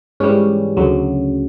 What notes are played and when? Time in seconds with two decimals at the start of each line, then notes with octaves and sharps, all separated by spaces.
0.20 G#2 E3 G3 C#4
0.77 D2 C#3 F#3